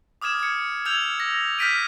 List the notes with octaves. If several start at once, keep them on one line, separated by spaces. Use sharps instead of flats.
D6 D#6 F6 G#6 E7
G#6 C#7
E6 F6 G6 G#6 F7
A#6
F6 G6 A#6 B6 D7 D#7